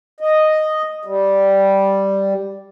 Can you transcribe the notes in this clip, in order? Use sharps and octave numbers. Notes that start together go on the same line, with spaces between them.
D#5
G3